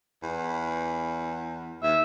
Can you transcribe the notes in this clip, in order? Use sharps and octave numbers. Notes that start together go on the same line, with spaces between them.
E2
D#2 E5